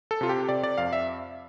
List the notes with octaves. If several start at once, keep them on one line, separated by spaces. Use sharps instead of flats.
A4
C3 F4
G4
C3 D5
D5
F2 F5
E5